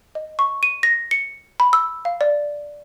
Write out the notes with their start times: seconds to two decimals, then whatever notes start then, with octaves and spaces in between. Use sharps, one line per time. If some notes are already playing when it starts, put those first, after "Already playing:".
0.15 D#5
0.39 C#6
0.63 D#7
0.83 A#6
1.11 C#7
1.60 B5
1.73 E6
2.05 F5
2.21 D5